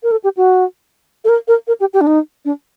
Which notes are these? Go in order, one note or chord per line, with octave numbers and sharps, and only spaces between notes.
A#4
A4
G4
F#4
A4
A#4
A#4
A#4
G4
G4
D4
D#4
D4